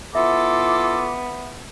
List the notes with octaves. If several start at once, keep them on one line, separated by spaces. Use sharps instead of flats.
B3 E4 F4 A4 E5 D6